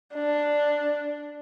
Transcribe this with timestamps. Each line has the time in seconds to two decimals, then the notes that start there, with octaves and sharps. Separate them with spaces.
0.15 D4